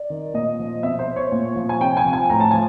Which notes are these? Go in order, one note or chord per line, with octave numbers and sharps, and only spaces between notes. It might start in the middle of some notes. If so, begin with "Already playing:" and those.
Already playing: D5
D#3
A#2 D#5
F3
B2 E5
C5
C#5
A#2
F3
G#5
C3 G5
G#5
F3
G#5
A2 A#5
A5
F3 G#5